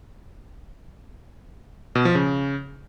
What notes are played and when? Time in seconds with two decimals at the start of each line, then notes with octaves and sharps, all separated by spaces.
1.95 B2
2.05 F3
2.15 C#3